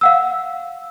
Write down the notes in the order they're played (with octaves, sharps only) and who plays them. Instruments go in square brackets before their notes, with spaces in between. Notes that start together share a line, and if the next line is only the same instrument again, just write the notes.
[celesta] F5 F#5 E6